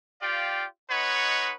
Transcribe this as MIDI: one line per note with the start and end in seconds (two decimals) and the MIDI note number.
0.22 0.65 65
0.22 0.65 67
0.22 0.65 74
0.22 0.65 77
0.22 0.65 79
0.90 1.53 56
0.90 1.53 63
0.90 1.53 71
0.90 1.53 73
0.90 1.53 78